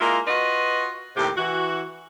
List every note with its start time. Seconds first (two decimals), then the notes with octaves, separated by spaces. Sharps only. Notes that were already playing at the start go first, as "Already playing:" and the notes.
0.01 G#3 A#3 E4 F4
0.27 F4 F#4 B4 D#5
1.16 D#2 A2 C3 G4
1.37 E3 F#4